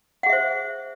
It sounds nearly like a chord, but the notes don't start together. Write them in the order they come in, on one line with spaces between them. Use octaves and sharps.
F#5 G#4 E5 C5